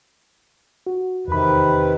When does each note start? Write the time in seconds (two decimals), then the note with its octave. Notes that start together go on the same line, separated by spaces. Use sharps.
0.87 F#4
1.28 E2 C3 D#3 B4 B5